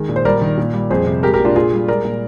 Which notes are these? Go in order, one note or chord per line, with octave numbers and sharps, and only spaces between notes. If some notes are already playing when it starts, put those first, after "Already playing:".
Already playing: D#3 G#3
A#2
C5
G3 A#4 D5
D#3
A#2
G3
F2 G#4 C5
C3
G#3 G4 A#4
G4 A#4
A#2
D4 F4
A#2 F4 G#4
G3
G#3 A#4 D5
A#2